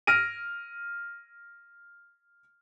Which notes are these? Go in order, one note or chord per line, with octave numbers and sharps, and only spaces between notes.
F6 A#6 D7 D#7